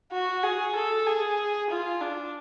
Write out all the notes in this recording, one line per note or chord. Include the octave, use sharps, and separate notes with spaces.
F#4
G#4
A4
G#4
F4
D4